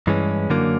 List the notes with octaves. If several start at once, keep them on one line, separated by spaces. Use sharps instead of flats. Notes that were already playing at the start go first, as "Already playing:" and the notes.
G2 E3 G#3 C#4
F#2 D3 F#3 A#3